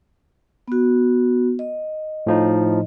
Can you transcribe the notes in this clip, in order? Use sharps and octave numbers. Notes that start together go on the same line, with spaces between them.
B3 F#4
D#5
A2 F3 D#4